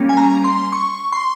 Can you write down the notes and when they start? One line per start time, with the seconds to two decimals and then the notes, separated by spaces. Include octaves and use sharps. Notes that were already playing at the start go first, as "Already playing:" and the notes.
Already playing: G3 A#3 C#4
0.09 G#5
0.17 A#5
0.44 C6
0.72 C#6
1.12 C6